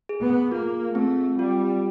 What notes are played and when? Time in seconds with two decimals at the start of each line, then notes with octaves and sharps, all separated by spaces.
0.09 G#4
0.23 B3
0.51 A#3 F4
0.95 A3 C4
1.39 G3 F4